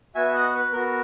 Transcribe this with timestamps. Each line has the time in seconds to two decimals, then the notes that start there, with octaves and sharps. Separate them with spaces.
0.15 B3 F#4 E5 G#5
0.34 D#5 F#5
0.54 B4
0.72 B3 F#4 A#4